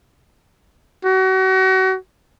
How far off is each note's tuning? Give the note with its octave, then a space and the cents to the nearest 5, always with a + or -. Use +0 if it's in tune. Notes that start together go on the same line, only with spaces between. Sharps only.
F#4 +35